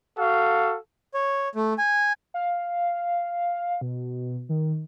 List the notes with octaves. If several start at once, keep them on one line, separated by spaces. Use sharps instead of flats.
F#4 A4 F5
C#5
A3
G#5
F5
B2
D#3